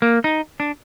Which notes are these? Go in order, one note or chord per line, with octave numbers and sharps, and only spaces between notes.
A#3
D#4
D4